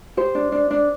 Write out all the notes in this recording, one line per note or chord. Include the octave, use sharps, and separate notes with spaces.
G4 C5
D4
D4
D4